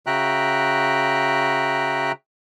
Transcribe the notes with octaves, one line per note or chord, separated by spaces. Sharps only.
C#3 F#4 E5 G5 A#5 F#6